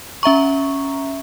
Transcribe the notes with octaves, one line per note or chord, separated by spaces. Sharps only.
C#4 E5 A#5 C#6